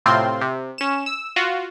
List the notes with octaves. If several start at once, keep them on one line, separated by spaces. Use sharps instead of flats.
A2 C3 C4 F4 C6
C3
C#4 E7
E6
F4 F#4